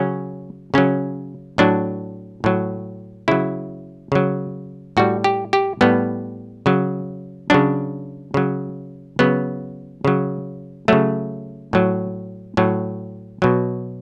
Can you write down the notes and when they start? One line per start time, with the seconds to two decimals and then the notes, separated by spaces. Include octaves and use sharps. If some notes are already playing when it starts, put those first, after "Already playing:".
Already playing: C#3 F#3 C#4
0.74 C#3 F#3 C#4
1.58 A2 F#3 D4
2.44 A2 F#3
3.28 C#3 F#3 E4
4.12 C#3 F#3
4.97 A2 G3 F#4
5.24 G4
5.53 G4
5.81 A2 G3 B3
6.66 C#3 F#3
7.50 C#3 F#3 D4
8.34 C#3 F#3
9.19 C#3 F#3 B3
10.05 C#3 F#3
10.88 C#3 F#3 A3
11.73 A2 F#3
12.57 A2 F#3
13.42 B2 F#3